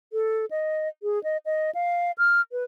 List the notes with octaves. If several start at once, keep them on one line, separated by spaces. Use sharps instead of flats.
A4
D#5
G#4
D#5
D#5
F5
F6
B4